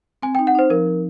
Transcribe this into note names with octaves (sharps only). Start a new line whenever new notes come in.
C4 G#5
G5
D#4
F#5
D#4 C5
F3 A#4
F3